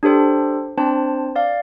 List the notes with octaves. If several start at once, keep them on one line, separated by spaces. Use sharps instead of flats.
D4 G4 A4 C5
C4 D4 C5 A5
D5 F5